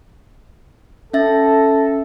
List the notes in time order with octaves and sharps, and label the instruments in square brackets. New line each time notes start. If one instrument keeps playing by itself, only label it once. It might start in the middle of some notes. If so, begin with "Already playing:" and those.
[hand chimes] C#4 E5 A6 [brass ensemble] A4